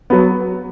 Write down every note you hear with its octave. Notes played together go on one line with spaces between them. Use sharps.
F#3 B3